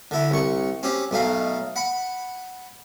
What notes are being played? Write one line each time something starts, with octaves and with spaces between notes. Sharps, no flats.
D3 E4
C2 C#6
C4 C#4 G4
B1 A3 D#4 F5
F#5 B5